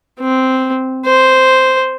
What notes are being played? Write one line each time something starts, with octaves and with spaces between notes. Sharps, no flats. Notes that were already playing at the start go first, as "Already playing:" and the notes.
C4
C5